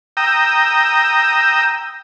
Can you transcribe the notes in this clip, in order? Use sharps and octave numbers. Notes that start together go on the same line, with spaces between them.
G5 A#5 D#6 E6